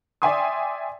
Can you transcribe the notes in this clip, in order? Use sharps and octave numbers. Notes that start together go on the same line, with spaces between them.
D5 E5 G5 G#5 C6 D#6